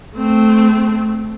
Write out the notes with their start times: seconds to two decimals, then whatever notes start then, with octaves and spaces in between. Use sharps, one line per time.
0.14 A3 C4